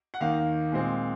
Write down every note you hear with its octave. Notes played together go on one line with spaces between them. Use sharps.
F#5
D#2 D#3 A#3 F5
A#2 G#3 C4